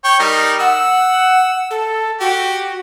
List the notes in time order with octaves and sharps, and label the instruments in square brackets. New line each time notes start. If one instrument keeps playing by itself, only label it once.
[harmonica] C#5 G5 C#6
G3 D#4 A#4
[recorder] F#5 [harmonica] E6
[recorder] A4
[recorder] F#4 [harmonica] G4